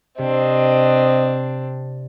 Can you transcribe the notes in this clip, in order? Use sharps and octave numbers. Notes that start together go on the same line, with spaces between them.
C3 C4 D4 D#5